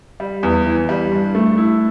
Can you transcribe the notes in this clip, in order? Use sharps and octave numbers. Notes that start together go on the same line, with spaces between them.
G3
E2
E3
G3
G2
A3
E4